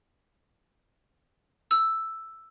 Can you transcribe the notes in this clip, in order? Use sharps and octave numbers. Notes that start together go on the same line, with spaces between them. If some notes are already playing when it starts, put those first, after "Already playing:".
E6